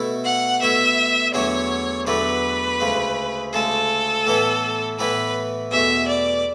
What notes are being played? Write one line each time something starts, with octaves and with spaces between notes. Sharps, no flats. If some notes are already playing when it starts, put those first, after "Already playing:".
Already playing: B2 A3 E4
F#5
B2 A3 E4 E5
E2 D3 F#3 A3 D4 C#5
E2 D3 F#3 A3 D4 B4
D2 C#3 G#3
D2 C#3 G#3 A4
A2 E3 B3 E4
A2 E3 B3 E4 B4
E2 B2 A3 E5
D5